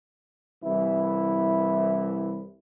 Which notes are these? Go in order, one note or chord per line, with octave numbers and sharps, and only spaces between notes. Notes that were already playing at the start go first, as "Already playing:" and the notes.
C2 E3 E4